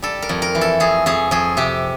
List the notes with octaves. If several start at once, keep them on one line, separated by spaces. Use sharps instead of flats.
G3 A4
A#4
F2
A#4
E3
A4
F2 G#4
F2 G#4
F2 G#4
C3 G4